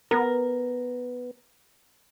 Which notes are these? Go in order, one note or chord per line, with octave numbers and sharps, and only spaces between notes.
B3 A#4